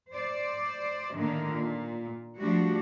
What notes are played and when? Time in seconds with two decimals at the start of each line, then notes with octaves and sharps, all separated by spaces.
0.14 C5 D5
1.15 A2 D3 D#3 A#3
1.52 A#2
2.39 F3 G3 A3 D4 F#4